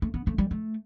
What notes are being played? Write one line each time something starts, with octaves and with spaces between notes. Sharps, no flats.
A3
B3
A3
G3
A3